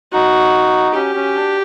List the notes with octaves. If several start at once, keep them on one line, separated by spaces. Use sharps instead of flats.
D#4 F#4
C#4 G4
C#4
D4